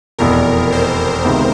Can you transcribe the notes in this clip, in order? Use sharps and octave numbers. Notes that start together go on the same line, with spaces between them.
F1 E2 B2 A#4
C5
C#2 C3 D#3 G#3 B3